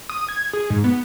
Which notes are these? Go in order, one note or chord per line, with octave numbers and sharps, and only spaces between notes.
D#6
G#6
G#4
G#2
B3